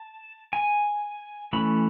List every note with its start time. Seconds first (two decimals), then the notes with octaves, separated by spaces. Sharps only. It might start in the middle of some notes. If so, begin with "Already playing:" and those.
Already playing: A5
0.53 G#5
1.53 E3 A3 C#4 B5